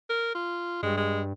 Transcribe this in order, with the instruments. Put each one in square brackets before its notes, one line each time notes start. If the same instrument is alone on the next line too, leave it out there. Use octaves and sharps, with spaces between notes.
[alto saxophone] A#4
F4
[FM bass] G2 [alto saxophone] G#3
[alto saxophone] G#3